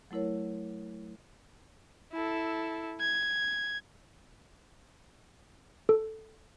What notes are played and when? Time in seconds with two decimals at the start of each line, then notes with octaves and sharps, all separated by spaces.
0.11 F#3 A3 E4 A#4 C#5
2.13 E4 A4
3.00 G#6
5.89 A4